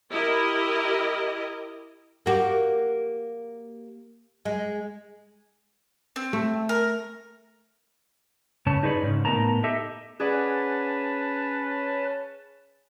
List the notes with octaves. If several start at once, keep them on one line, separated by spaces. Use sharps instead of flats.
E4 G4 A#4 D#5
A#3 F#4 G4
G#3
C4
A3
A#4
G2 C#3 C#4 A5
D#4 G#4 B4 C#5 D5
G#2 C#3
A2 B3 D#4 A#4 A5 A#5
G4 A4 D#5 E5
C#4 G#4 B4 D5 F#5 A5